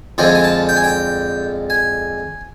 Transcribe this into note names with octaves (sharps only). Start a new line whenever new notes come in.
F2 D3 F3 G#3 G#5
G#5
A5
G5
G#5
G5
G#5